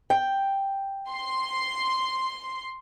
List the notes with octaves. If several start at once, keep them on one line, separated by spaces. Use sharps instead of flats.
G5
C6